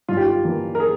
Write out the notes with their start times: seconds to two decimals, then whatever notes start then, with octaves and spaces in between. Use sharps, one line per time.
0.08 G2 F4
0.17 G4
0.25 F4
0.44 E3 A#3
0.75 A#4
0.80 G#4